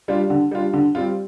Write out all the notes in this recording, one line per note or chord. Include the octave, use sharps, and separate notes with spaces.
G3 D4 F4
D3
G3 D4 F4
D3
G3 C4 F4